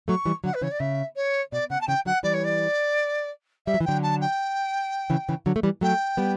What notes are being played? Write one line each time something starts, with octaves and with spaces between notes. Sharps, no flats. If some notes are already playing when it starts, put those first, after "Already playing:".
F#3 A3 C#6
E3 G3
D3 F#3 F#5
B4
C#3 E3 C#5
D5
C#3 E5
C#5
B2 D5
C#3 F#5
A5
C#3 E3 G5
D3 F#3 F#5
E3 G3 D5
C#5
D5
G3 E5
F#3
E3
D3 F#3 G5
A5
G5
C#3 E3
C#3 E3
D3 F#3
A3
E3 G3
F#3 A3 G5
G3 B3